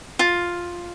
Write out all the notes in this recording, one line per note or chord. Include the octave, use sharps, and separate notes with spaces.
F4